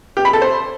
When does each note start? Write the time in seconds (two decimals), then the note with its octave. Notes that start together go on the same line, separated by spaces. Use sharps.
0.17 G4
0.25 B5
0.33 A4
0.42 C5